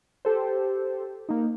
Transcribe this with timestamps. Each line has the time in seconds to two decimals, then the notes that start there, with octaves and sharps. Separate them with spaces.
0.25 G4 A4 C5
1.29 A#3 D#4